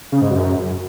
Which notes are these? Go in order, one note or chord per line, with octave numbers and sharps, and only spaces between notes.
C#3
G#2
F#2